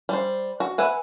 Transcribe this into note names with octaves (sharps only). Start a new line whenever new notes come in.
G3 C5
F#4
B4 E5 F#5 G#5